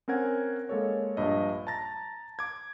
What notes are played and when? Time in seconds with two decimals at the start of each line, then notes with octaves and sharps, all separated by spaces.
0.08 C4 C#4 A#4 F#5 G#6
0.69 G#3 A#3 A4 C#5
1.17 A#1 G2 D#5
1.67 A5 A#5 A6 A#6
2.39 D6 G#6